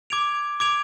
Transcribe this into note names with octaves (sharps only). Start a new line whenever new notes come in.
D6 G#6 D7 F7
D6 G#6 D7 F7